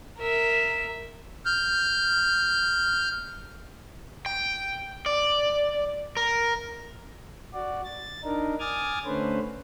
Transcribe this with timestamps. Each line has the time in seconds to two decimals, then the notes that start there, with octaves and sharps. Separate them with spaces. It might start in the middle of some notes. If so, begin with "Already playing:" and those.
0.19 A#4 E5
1.45 F6 G6
4.26 G5
5.06 D5
6.17 A#4
7.54 F#4 D5
7.84 A6
8.24 D4 D#4 A#4
8.60 G#5 D6 D#6 F6 G#6 A6
9.05 D3 A3 C#4 B4 C5